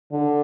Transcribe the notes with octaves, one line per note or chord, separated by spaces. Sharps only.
D3